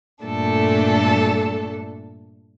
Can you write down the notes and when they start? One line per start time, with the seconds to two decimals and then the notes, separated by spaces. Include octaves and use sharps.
0.24 G2 A#2 A3 D4 A4